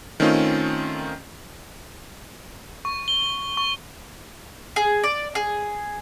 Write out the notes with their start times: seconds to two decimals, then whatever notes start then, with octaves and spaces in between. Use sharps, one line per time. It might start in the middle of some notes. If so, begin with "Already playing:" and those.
0.20 D#3 A3 C4 C#4 D#4 F4
2.85 C#6
3.08 G7
3.57 C#6
4.76 G#4
5.03 D5
5.35 G#4